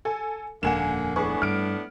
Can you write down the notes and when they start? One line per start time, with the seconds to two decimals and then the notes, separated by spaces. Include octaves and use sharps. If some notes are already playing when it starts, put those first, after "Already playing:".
0.05 A4 G#5
0.63 D#1 F2 D3 A#3 F#5 G#5 E7
1.16 A2 B3 D4 G#4 B4 C#6
1.42 G2 F6 D7